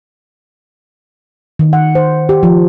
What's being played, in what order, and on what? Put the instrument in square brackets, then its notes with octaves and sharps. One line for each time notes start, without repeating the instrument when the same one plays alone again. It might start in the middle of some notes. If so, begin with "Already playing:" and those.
[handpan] D#3
F#5
C5
G4
F3